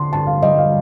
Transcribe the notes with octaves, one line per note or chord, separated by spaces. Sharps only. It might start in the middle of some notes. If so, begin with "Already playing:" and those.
Already playing: D3 C6
G2 A5
F5
G3 D#5
F5